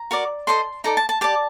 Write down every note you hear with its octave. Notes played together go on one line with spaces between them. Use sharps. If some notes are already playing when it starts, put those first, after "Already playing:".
Already playing: A#5
F#4 A#4 D5
A4 C5 D#5 C6
D#4 A4 D5 A#5
A5
A5
G4 D5 A5